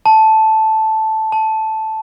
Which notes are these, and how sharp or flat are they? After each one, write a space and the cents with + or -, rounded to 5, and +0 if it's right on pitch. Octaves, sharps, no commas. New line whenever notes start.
A5 -5
A5 -5